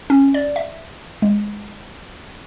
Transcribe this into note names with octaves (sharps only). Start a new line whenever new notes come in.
C#4
D5
E5
G#3